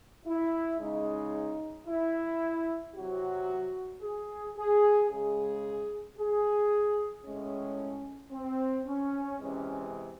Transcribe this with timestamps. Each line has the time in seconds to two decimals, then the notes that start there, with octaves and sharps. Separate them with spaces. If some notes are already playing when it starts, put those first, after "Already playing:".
0.25 E4
0.80 C#3 G#3 D#4
1.87 E4
2.95 C3 F#3 F#4
4.02 G#4
4.56 G#4
5.10 C#3 G#3 G#4
6.17 G#4
7.24 A2 G#3 C#4
8.32 C4
8.86 C#4
9.40 C3 E3 G#3 C#4